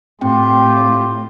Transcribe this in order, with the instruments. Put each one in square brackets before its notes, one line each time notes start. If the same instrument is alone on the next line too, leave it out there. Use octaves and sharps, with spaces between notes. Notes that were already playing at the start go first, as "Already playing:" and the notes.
[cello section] A2 [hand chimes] C4 G5 [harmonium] F4 [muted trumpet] G4